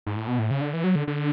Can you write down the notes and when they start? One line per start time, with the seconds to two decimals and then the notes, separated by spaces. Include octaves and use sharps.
0.07 G#2
0.16 A2
0.28 B2
0.39 A2
0.51 C#3
0.61 D3
0.73 E3
0.84 F#3
0.95 D3
1.07 D3